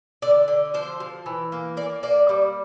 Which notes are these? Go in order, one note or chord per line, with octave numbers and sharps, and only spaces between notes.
D3 D5
D3
F3 C5
F3
E3
A#3
A#3 D5
A#3 D5
G3